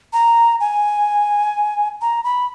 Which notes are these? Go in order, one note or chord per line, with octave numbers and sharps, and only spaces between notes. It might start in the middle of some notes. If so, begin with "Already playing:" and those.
A#5
G#5
A#5
B5